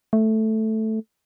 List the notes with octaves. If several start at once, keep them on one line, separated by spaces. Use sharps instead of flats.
A3